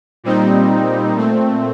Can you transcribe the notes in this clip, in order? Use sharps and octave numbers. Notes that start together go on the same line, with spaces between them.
A#2 G3 C4 D#4
A#2 A3 C4